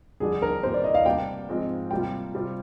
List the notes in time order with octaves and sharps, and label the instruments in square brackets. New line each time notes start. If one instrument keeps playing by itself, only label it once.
[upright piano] F2 D3 G3 D4 [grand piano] G#4
[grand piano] A#4
[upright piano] G2 D#3 G3 A#3 [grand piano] C5
[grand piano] D5
D#5
F5
[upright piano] D2 C3 G3 A#3 D4 [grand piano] G5
[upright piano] G#2 F3 G#3 C4 F4
[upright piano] C3 G3 A#3 F4 [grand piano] G5
[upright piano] C3 G3 C4 F4